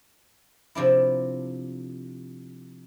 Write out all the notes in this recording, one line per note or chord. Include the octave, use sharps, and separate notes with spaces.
C3 F3 D4 E4